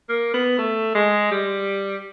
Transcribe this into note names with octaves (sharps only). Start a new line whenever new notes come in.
A#3
B3
A3
G#3
G3